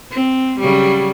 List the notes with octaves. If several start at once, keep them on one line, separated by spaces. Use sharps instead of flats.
C4
C#3 F#3 G3